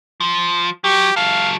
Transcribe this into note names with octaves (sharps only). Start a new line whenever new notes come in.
F3
F#3 G4
F#3 A4 F5